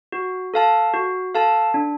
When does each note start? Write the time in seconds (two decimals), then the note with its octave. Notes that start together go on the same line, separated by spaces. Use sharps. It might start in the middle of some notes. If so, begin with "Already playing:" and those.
0.12 F#4
0.54 A4 F5 A5
0.94 F#4
1.35 A4 F5 A5
1.74 D4